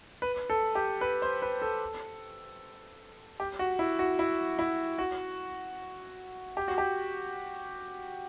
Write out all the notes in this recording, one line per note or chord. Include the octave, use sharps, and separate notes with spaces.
B4
A4
G4
B4
C5
B4
A4
G4
F#4
E4
F#4
E4
E4
F#4
G4
F#4
G4